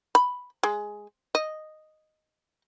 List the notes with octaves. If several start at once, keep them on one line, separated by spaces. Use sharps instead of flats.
B5
G#3
D#5